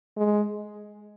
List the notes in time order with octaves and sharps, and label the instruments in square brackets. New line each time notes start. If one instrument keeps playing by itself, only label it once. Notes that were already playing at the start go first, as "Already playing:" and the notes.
[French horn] G#3